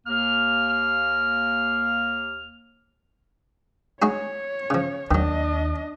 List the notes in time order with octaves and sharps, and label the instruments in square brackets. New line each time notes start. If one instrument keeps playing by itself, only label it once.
[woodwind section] D#2 A#3 F6
[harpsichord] G#3 D#4 F#4 [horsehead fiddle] C#5
[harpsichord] C#3 F3
[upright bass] D#2 [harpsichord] D#3 F#3 [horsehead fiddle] D4 D#5